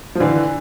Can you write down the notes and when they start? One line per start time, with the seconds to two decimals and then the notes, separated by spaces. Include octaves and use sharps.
0.15 F3
0.20 D3 E3